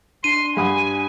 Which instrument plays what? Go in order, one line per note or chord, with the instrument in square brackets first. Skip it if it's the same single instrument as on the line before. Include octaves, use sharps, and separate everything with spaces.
[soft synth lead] D4 [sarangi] C6 [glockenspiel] D#7
[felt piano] G2 F#5 D#6 [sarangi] G#5